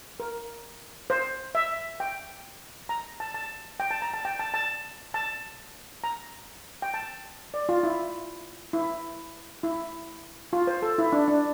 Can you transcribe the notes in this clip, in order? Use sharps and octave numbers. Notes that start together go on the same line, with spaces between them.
A#4
C5
E5
G5
A#5
A5
A5
G5
A5
A#5
A5
G5
A5
A5
A5
A#5
G5
A5
D5
F4
E4
E4
E4
F4
C5
A4
E4
D4
D4